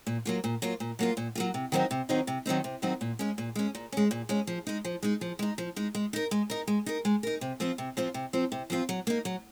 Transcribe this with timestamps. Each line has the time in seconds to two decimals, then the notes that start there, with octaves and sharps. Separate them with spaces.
0.07 A#2
0.25 F#3 A#3 F4
0.44 A#2
0.62 F#3 A#3 F4
0.80 A#2
0.99 F#3 A#3 F4
1.17 A#2
1.35 F#3 A#3 F4
1.54 C3
1.72 D#3 F#3 C4 D#4
1.91 C3
2.09 D#3 F#3 C4 D#4
2.27 C3
2.46 D#3 F#3 C4 D#4
2.64 C3
2.82 D#3 F#3 C4 D#4
3.01 A#2
3.19 G#3 C#4
3.38 A#2
3.56 G#3 C#4
3.75 A#2
3.92 G#3 C#4
4.11 A#2
4.29 G#3 C#4
4.47 F3
4.67 G#3 D#4
4.85 F3
5.02 G#3 D#4
5.21 F3
5.39 G#3 D#4
5.58 F3
5.76 G#3 D#4
5.95 G#3
6.13 D#4 A#4
6.31 G#3
6.50 D#4 A#4
6.67 G#3
6.86 D#4 A#4
7.05 G#3
7.23 D#4 A#4
7.41 C3
7.60 F3 C4 F4
7.78 C3
7.97 F3 C4 F4
8.14 C3
8.33 F3 C4 F4
8.52 C3
8.70 F3 C4 F4
8.89 F#3
9.07 A#3 D#4
9.25 F#3